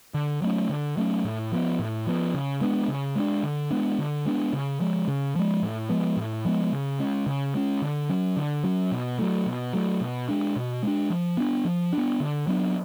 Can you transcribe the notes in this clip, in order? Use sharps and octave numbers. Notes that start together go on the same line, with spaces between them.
D3
F#3 A3 C#4
D3
F#3 A3 C#4
A2
F3 B3
A2
F3 B3
C#3
G#3 B3 D4
C#3
G#3 B3 D4
D3
G#3 B3 D4
D3
G#3 B3 D4
C#3
F3 G#3
C#3
F3 G#3
A2
F3 G#3 B3
A2
F3 G#3 B3
C#3
G#3 C#4
C#3
G#3 C#4
D3
F#3 C#4
D3
F#3 C#4
B2
F#3 A3
B2
F#3 A3
B2
G#3 D4
B2
G#3 D4
F3
B3 D4
F3
D4
B3
D3
F#3 B3 D4